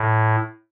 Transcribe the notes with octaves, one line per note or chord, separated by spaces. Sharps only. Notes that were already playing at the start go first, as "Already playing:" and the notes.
Already playing: A2